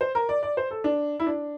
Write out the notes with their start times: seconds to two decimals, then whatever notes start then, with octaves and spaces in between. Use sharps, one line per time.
0.01 C5
0.15 A#4
0.29 D5
0.43 D5
0.57 C5
0.71 A4
0.84 D4
1.20 E4
1.27 D4